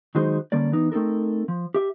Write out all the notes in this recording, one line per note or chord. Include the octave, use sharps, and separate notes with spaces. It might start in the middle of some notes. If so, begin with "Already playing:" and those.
D#3 F#3 G#3 D#4 F#4 C5
D3 G3 A#3 C#4 D5
E3 B3 D#4
A3 C4 D#4 A4 A#4
F3
G4 E5